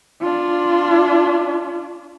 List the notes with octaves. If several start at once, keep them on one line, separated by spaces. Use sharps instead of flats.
D4 F4